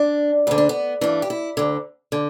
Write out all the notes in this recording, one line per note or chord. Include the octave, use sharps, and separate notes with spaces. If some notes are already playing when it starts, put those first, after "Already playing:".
Already playing: D4
D2 D3 B3
D4
B3
G2 E3 D4
G4
E4
D2 D3
D3